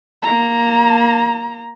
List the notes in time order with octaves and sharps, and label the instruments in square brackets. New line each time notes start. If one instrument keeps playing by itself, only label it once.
[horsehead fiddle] A#3 A#5